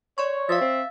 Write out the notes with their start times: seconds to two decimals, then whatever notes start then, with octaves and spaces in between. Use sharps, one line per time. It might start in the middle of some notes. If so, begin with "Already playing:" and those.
0.18 C#5 D5 C6 C#6
0.49 F3 E5 F5 A6
0.61 C4